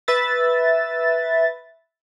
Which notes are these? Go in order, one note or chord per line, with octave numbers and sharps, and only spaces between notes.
B4 E5 A6